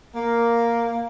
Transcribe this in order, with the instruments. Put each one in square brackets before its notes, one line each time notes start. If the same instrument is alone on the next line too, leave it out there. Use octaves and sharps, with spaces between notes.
[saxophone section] A#3